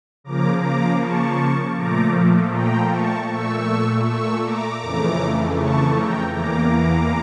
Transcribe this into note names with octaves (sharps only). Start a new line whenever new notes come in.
C#3 F3 A#3 A#5 D6
A#5 D6
A5 C#6
A#2 F3 A3 A#5 D6
G5 A#5
A5 C#6
A#2 A3 C#6 E6
C#6 E6
A#5 D6
F2 C#3 E3 A3
A5 C#6
G5 A#5
E2 E3 A#3 A#5 D6